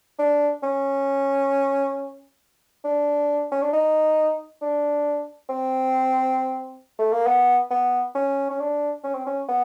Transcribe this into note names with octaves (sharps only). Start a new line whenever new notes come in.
D4
C#4
D4
C#4
D4
D#4
D4
C4
A3
A#3
B3
B3
C#4
C#4
D4
C#4
C4
C#4
B3